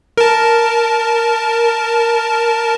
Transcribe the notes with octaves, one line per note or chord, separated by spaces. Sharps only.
A#4 A5